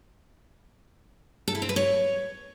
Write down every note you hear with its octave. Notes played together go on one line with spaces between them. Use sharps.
A4
E4
C4
B4
C#5